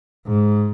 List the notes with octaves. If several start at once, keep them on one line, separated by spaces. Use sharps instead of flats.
G#2